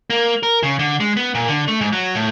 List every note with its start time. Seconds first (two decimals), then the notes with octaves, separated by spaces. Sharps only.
0.10 A#3
0.43 A#4
0.63 C#3
0.79 D3
1.00 G#3
1.17 B3
1.35 A#2
1.49 D3
1.68 A3
1.81 G#2
1.93 F#3
2.15 A2